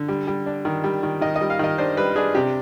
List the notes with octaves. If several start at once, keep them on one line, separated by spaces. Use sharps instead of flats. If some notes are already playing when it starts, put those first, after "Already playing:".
Already playing: D3
G3
G3
D4
D#3
G3
D#3
D#3 D#5
D#5
G3
F5
D#3 D#5
D4 C5
G3 B4
D4 G#4
C3 G4